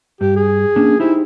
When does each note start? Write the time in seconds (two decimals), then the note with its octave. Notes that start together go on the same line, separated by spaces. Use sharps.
0.21 G2 G4
0.36 G#4
0.76 A#3 C#4 D4
1.00 D#4 E4 G4 C5